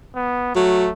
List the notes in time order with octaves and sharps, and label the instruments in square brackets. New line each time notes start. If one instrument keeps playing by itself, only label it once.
[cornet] B3
[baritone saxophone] F#3 [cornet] A3